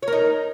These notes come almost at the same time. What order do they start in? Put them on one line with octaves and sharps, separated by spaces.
C#5 A#4 D#4